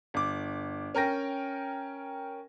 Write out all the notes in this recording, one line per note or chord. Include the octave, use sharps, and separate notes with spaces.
G1 D6
C#4 A#4 G5 A#6